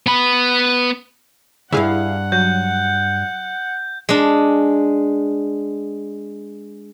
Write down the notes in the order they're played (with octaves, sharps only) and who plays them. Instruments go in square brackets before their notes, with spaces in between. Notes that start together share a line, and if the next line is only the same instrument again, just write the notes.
[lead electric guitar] B3 B5
[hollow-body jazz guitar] D2 G2 [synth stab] E4 G#4 F5 [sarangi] F#5
[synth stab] F#3 [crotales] G6
[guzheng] G#3 D4